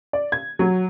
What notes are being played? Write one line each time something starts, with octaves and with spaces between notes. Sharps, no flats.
D5
G#6
F#3